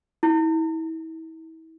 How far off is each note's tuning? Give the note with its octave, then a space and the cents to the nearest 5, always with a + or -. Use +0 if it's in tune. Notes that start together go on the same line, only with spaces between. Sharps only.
E4 -35